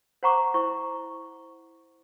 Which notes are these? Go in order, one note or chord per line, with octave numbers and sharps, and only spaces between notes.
C5 F#5 A#5 C#6 D6
E4 C5 C#6